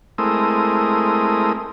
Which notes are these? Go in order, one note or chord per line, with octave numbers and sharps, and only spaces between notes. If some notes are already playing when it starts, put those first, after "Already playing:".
G#3 A3 C4 E4 A#4 D#6